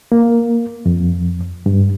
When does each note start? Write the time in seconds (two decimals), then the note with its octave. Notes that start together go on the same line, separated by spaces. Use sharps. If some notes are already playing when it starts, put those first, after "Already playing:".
0.12 A#3
0.86 F2
1.66 G2